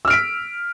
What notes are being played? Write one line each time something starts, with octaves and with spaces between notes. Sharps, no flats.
E6 F6 B6 D7